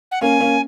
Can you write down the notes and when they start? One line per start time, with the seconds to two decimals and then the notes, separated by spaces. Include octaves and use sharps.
0.11 F#5
0.21 A#3 C#4 G#5
0.40 A#3 C#4